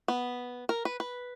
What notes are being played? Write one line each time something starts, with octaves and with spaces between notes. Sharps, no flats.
B3
A#4
B4
B4